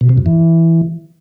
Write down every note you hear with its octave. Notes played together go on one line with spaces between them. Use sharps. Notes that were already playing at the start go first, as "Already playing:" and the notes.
B2
C3
F#2
E3